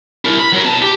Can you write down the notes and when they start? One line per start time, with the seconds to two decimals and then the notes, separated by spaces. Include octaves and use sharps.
0.25 E4 A#4
0.40 B5
0.53 F#3 A#4
0.64 B2 A5
0.82 G4